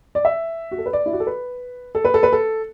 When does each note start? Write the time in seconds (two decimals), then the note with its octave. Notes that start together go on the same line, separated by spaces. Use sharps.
0.15 D5
0.25 E5
0.71 F#4
0.78 A4
0.86 B4
0.93 D5
1.06 E4
1.13 F#4
1.20 A4
1.27 B4
1.95 A4
2.05 B4
2.14 A4
2.23 B4
2.33 A4